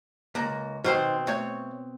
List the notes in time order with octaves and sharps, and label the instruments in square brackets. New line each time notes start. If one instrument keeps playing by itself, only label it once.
[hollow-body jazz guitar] C#2 A#3
[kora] B2 C4 [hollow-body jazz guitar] D#3 C5 C6
[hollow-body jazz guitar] A3 C#5